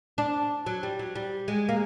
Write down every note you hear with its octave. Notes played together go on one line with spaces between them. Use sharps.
D4
F#3
G3
F#3
G3
G#3
A#3